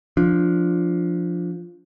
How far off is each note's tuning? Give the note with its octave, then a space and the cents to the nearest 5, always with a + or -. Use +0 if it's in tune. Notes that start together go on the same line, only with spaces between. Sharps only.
F3 +0 D4 +0